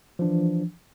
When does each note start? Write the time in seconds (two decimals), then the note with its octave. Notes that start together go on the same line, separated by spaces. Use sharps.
0.19 F3
0.22 D4
0.24 E3